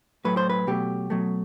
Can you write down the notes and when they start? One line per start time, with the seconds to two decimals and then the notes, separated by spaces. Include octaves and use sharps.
0.25 A2 F#3 A3 B4
0.37 C5
0.50 B4
0.67 B2 F#3 A3 G4
1.10 B2 F#3 A3